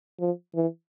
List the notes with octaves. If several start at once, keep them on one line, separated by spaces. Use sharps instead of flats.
F3
E3